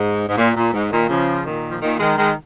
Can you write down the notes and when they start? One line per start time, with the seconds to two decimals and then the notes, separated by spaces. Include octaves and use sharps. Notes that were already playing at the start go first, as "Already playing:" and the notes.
Already playing: G#2
0.29 G#2
0.37 A#2
0.56 A#2
0.73 G#2
0.91 A#2 D#3
1.09 C#3 F3
1.46 A#2 D#3
1.71 F3
1.82 A#2 D#3
1.99 D#3 G#3
2.18 D#3 G#3